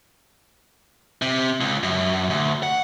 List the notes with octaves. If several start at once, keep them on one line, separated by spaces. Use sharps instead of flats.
C3
C#2
F#2
D2
F#5